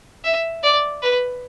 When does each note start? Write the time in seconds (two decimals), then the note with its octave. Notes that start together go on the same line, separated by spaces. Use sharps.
0.24 E5
0.63 D5
1.02 B4